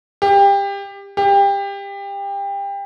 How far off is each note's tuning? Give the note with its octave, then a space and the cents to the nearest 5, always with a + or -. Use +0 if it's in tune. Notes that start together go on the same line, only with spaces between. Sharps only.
G4 +25
G4 +25